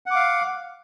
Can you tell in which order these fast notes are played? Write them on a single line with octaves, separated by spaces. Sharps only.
F#5 D6 F5